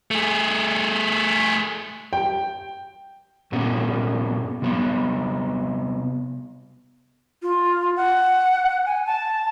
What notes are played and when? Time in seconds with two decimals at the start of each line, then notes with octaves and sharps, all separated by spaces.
0.11 A3 G#4
2.13 G5
3.52 G2 A#2 B3 C#4 F#4
4.62 C3 G3 B3
7.42 F4
7.97 F#5
8.86 G#5
9.06 A5